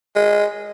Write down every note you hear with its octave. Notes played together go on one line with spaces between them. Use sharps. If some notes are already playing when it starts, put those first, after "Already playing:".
G#3